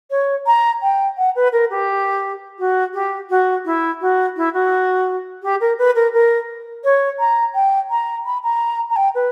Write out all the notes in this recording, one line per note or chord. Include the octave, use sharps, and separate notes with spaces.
C#5
A#5
G5
F#5
B4
A#4
G4
F#4
G4
F#4
E4
F#4
E4
F#4
G4
A#4
B4
A#4
A#4
C#5
A#5
G5
A#5
B5
A#5
A#5
G5
B4